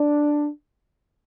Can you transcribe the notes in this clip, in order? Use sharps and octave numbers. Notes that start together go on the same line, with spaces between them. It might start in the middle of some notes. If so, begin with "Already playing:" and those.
Already playing: D4